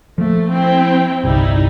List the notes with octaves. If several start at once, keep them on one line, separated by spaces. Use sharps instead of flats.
F3 A3 A#3
C4 E4 G5
G1 C2 G3 D#4 E4